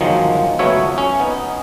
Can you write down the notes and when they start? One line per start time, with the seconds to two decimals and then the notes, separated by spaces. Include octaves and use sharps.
0.01 G1 D#3 F3 F#3 G#3 D#4
0.59 C#2 F#3 A3 B3 C#5 E5
0.98 C#4
1.20 B3 D#4